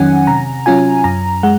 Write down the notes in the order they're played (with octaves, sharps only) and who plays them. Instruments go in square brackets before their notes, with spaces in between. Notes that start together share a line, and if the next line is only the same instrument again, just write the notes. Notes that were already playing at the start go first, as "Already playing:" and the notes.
Already playing: [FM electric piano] F2 D#3 F#3 C#4 F#5 G#5
C3 A#5
F#3 C#4 F4 G#5
F#2 A#5
G#3 F#5